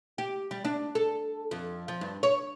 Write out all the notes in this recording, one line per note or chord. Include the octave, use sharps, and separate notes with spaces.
G4
G3
D4
A4
F2
F3
G2
C#5